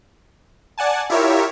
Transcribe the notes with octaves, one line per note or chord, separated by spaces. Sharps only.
D5 F#5 G#5 A5
E4 F4 G4 A#4 C#5 E5